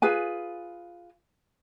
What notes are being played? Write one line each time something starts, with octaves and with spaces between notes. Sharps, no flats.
F4 G#4 B4 G#5